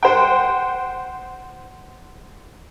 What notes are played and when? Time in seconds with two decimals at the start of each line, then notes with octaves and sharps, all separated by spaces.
0.03 C5 F#5 G5